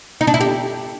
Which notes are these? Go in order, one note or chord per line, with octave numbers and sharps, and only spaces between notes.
D#4
D4
E4
G4